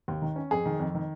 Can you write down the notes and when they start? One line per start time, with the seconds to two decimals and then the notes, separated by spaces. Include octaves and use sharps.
0.08 D#2
0.22 D#3
0.36 C#4
0.51 F2 G#4
0.65 D#3
0.80 F2
0.95 D#3